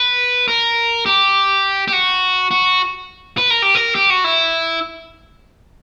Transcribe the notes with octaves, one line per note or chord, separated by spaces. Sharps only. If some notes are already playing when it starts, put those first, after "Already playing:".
Already playing: B4
A#4
G4
G4
F#4
F#4
B4
A#4
G4
A#4
G4
F#4
E4